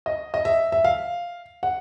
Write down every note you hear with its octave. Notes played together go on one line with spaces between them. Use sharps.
D#5
D#5
E5
E5
F5
F#5